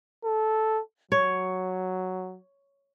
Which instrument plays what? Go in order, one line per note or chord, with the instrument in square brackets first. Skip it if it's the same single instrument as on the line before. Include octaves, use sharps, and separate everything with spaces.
[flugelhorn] A4
[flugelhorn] F#3 [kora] C#5